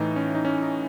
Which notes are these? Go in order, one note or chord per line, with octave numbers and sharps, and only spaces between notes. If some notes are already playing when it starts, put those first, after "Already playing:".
Already playing: A2 E3 D#4
C#4
D#4
C#4
D#4